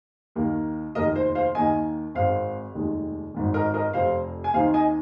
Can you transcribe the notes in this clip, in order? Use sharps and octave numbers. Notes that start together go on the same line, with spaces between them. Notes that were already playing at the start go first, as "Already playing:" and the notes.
D#2 D#3 A#3
F1 D#2 D#3 A#4 D#5
C5
C5 F5
D#2 D#3 A#3 D#5 G#5
G#1 G#2 G#3 C4 C5 F5
F1 D#2 D#3 G#3
G#1 G#2 D#3
A#4 D#5
A#4 D#5
F1 F2 C3 C5 F5
G#5
D#2 D#3 C4 D#4 C5 F5
D#5 G#5